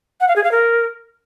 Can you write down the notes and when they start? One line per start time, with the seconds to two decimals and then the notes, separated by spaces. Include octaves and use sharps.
0.21 F#5
0.28 F5
0.36 G#4
0.44 F5
0.52 A#4